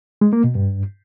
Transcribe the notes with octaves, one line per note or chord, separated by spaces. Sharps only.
G#3
A#3
B2
G2